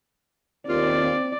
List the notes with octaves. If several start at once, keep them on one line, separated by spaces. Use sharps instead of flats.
D#2 C4 F4 D5